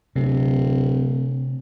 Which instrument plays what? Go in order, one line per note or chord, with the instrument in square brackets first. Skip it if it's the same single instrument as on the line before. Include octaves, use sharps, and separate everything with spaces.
[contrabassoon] D1 [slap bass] C3